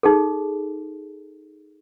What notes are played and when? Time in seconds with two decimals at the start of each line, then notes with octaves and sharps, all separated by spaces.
0.03 D#4 G#4 A4